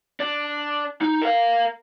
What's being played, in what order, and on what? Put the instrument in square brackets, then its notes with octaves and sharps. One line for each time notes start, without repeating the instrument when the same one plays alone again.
[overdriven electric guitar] D4
D#4
A#4 F5